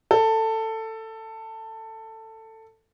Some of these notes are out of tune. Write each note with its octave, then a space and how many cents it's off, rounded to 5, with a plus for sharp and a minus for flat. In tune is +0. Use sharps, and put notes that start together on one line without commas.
A4 +15